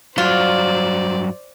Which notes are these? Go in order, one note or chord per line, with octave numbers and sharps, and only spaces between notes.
G2 F#3 F4 C5 D5